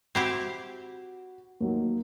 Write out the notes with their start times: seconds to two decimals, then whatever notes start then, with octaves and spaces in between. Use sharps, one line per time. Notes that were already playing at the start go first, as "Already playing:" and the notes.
0.15 C4 E4 F#4 G4
1.60 D#2 F#3 A#3